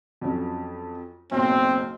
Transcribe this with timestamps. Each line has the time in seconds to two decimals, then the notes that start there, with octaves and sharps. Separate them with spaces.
0.21 F2 F#3 C#4
1.32 F#1 B1 C4